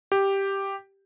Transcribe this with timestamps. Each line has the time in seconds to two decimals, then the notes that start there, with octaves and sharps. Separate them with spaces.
0.12 G4